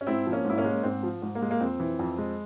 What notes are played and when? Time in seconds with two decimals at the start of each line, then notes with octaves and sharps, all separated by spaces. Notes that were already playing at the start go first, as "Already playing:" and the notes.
0.01 C#4
0.07 G#2 C4 E4
0.27 F3
0.32 A#3 C#4
0.45 G#2 E4
0.58 A#3 C#4
0.64 G#3
0.83 G#2 C4
1.03 F3
1.22 G#2
1.35 A#3
1.42 G#3
1.51 A#3
1.61 F2 C4
1.80 E3
1.99 F2
2.18 G#3